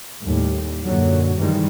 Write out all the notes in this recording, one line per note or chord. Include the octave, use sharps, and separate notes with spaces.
D#2 A2 G3
F#2 A#2 D3 F#3
G2 C3 D#3 E3 G3 G#3